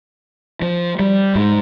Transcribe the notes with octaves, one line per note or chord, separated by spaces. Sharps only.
F3
G3
G#2